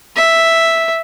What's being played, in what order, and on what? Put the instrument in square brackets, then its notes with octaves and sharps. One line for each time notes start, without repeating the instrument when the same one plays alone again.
[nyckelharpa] E5